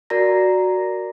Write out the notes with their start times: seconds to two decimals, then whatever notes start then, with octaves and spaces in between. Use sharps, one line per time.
0.10 F#4 A#4 D5 A#5 A#6